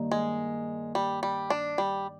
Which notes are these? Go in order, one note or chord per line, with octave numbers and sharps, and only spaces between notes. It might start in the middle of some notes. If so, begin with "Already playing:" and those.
Already playing: G2 D#3 A#3
G#3
G3
G3
D4
G3